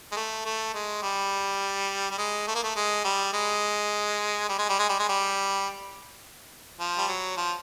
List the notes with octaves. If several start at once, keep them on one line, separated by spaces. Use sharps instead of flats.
G#3
A3
A3
G#3
G3
G3
G#3
A3
A#3
A3
G#3
G3
G#3
G3
G#3
G3
G#3
G3
G#3
G3
F3
G3
F#3
F3